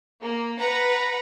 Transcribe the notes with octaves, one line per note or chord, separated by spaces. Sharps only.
A#3
B4 F#5 A#5